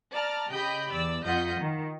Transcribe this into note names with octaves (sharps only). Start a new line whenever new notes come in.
D5 A5 A#5 F6
C#3 G4 D#5 G5 B5 G6
E2 D5 E6
F2 F4 D#5 F#5 G6 B6
D#3